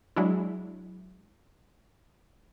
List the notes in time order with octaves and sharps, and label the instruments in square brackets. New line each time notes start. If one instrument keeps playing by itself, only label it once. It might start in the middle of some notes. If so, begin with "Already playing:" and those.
[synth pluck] F#3 G#3 D4 E4